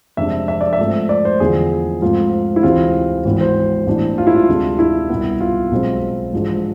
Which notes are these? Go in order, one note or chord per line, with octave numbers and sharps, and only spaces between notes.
F1 F2 C3 G#3 D4 E5
E5
D5
E5
G#2 F3 A3 C4
D5
C5
E2 D3 F3 B3 G#4
G#2 F3 A3 C4 F4
E4
D2 C3 E3 G#3 C4 F4
G#1 G#2 E3 B3
C5
A1 A2 E3 B3 D4
F4
E4
F4
D2 C3 G#3 D4
E4
C2 B2 B3
F4
B1 B2 G#3 C4
A1 G#2 F3 G#3 D4